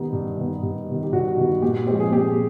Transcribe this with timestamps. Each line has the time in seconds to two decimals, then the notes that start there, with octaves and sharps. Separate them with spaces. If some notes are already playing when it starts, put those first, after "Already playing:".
Already playing: D#3 G3 B3 D#4
0.12 G2
0.37 D#3 G3 B3
0.63 G2
0.88 D#3 G3 B3
1.03 G4
1.12 G2 F#4
1.37 D#3 G3 B3
1.62 A#2 G4
1.87 F3 G#3 C4 G4
2.00 G#4
2.11 A#2 G4